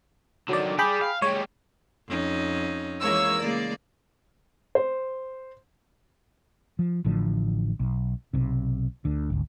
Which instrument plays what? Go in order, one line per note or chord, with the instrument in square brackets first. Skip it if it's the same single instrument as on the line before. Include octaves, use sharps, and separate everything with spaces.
[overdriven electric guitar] D3 D#3 [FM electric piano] F#3 D5
[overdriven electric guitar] G4 D5 [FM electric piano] G#4 G5 B5
[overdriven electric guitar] F5
[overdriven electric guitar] G#3 G4 [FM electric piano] C#5
[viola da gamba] F2 C#4 D#4
[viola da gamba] E3 G#3 [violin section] A#3 C#5 E6
[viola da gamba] C#3 G#3 A#3 [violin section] D5
[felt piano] C5
[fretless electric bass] F3
A1 A2 D3 F3
B1
B1 C3
D2 D3
G#1 D2